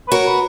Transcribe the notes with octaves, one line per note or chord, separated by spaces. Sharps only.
B4
F#4 A#4 C#5
B4